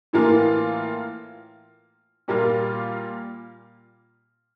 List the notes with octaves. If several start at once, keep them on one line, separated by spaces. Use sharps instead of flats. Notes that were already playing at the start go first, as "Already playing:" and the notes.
A2 E3 A#3 F4
A#2 G3 A#3 F4